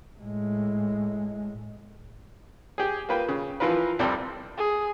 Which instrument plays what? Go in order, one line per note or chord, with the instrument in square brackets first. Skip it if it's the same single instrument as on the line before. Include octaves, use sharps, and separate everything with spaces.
[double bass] A2 G#3
[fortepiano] G4 G#4
A#3 F4 B4 G5
C#3
E3 F3 F4 A#4 B4
C2 F2 G3 C4 A4
[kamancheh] G#4